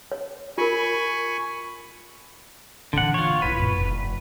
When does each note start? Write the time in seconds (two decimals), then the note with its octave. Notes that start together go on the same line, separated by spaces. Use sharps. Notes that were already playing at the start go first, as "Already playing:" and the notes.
0.12 C#5
0.58 F4 A#4 G#5 B5 C#6
2.93 A#2 D3 E3 F#5
3.14 F4 C#5
3.42 G#1 E4 B4
3.59 G1 A#2
3.72 F1